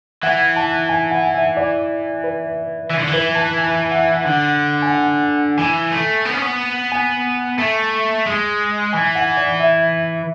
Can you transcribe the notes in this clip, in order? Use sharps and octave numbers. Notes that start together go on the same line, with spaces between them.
E3 F#5
A5
G#5
F#5
E5
D5
B4
E3
D3
E3
B4
A5
G#5
F#5
D3 F#5
G#5
F#5
E3 G#5
A3
B3
C#4
B3
G#5
A3
G#3
E3 G#5
F#5
D5
E5